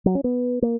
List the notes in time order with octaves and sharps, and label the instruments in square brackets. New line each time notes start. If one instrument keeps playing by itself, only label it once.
[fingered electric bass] F#3
C#4
B3
A#3